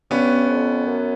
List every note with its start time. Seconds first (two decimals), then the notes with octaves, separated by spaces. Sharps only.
0.11 G2 B3 C#4
0.49 F2
0.86 F#2